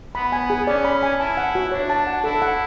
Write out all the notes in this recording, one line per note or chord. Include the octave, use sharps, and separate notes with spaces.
B3 B5
G#5
G#4
C#4 D5
B5
G#5
E4 A5
F#5
F#4
D4 C#5
A5
F#5
E4 A4
F#5